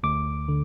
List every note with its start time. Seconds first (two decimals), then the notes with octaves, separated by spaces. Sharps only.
0.03 D2 D6
0.49 D3